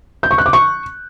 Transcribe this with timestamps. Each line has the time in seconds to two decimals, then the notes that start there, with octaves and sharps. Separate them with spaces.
0.23 G6
0.31 C#6
0.38 F#6
0.46 D6
0.53 C#6